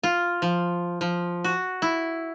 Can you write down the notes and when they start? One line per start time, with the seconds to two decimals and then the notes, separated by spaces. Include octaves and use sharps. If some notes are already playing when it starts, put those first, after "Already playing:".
0.04 F4
0.42 F3
1.01 F3
1.44 F#4
1.82 E4